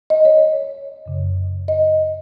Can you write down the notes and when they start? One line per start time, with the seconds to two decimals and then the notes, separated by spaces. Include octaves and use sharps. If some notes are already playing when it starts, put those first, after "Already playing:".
0.10 D#5
0.25 C#5
1.06 F#2 C#3
1.68 D#5